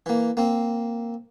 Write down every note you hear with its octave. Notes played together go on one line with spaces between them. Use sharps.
E3 A#3
A#3 C4